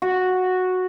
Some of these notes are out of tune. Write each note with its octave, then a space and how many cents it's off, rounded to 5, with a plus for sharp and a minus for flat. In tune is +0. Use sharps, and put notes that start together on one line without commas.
F#4 -5